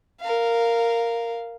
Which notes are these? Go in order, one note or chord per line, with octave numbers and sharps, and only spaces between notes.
A#4 F5